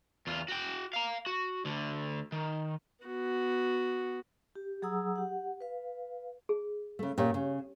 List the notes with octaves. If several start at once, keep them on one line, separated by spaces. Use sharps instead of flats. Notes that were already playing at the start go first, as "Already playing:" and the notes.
E2 F4
F#4 G5
F5 A#5
F#4
D2 D3
D#3
B3 F#4
G4
F#3 G#4 F#5 A#5 D#6 E6
G4 F#5
B4 F5
G#4
C#3 A3
A#2 C#4 G4 C#5
C#3